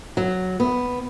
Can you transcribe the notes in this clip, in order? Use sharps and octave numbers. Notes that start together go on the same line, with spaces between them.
F#3
B3